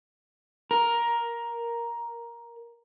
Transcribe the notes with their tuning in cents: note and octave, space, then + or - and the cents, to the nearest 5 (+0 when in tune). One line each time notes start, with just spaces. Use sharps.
A#4 +10